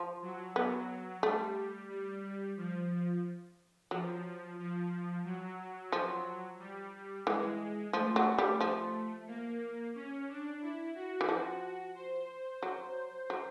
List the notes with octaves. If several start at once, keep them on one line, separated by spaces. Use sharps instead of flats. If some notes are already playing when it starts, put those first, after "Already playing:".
Already playing: F3
F#3
F#3 B3
G3 A3
G3
G3
F3
F3 F#3
F3
F#3
F3
G3
E3 G#3
F3 A3
F#3
G3
F3
A#3
C#4
D4
E4
F#4
E3
F3
C5
F#3
F#3